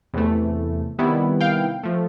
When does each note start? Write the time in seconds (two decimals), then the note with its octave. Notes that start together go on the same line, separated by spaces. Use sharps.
0.14 E2 C3 E3 A3
0.98 C3 D#3 G3 B3 E4
1.41 F5 G5
1.83 F3 A3